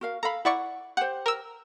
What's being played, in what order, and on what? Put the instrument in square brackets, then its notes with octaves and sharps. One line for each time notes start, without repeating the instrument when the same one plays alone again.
[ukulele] F#4 A#4 F5
[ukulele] A4 F5 [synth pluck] A#5 B5
[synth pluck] E4 D5 C#6 [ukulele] F#5
[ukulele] G4 C5 [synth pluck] F#5
[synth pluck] A#4 E6